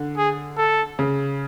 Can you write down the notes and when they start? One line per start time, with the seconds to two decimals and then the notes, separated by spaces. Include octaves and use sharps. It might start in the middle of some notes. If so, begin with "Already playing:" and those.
Already playing: D3
0.17 G#4
0.58 A4
0.99 C#3